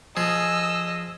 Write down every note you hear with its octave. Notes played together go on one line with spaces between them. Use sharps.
F3 G#4 D#5 E6